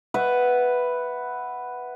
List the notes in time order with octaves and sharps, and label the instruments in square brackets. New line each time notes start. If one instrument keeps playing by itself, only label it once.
[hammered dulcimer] B4 E5 F#5